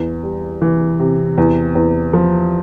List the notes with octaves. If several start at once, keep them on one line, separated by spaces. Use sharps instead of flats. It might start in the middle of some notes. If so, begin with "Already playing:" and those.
Already playing: E2
G3
E3
C3
E2
E2
F3